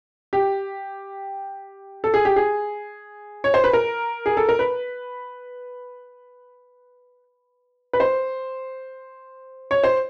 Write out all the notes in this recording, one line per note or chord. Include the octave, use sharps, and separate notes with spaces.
G4
A4
G#4
G4
G#4
C#5
C5
B4
A#4
G#4
A4
A#4
B4
B4
C5
C#5
C5